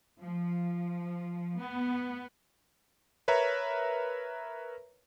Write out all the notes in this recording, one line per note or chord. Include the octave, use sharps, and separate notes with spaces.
F3
B3
A#4 B4 C#5 E5 A#5